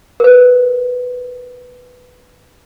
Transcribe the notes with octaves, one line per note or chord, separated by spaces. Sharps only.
A#4 B4